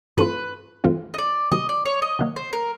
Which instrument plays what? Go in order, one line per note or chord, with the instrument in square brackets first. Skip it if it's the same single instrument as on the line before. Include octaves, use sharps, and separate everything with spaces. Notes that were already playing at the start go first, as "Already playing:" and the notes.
[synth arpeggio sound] G2 E3 A3 C4 F4 [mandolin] B4
[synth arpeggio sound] G2 E3 A3 C4 F4
[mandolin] D#5
D5
[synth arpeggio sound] C3 D#3 F#3 A#3 [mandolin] D#5
[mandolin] D5
C#5
D#5
[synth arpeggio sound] C3 D#3 F#3 A#3
[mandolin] C5
A#4